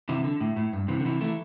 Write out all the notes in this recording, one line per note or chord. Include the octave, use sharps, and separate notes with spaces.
C3 E3
D3
A2
A2
G2
C3 E3
D3
C3 E3
E3 A3